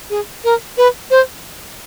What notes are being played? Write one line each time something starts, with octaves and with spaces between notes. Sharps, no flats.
G#4
A#4
B4
C5